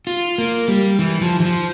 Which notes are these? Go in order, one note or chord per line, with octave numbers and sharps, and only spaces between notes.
F4
A#3
G3
E3
F3
E3
F3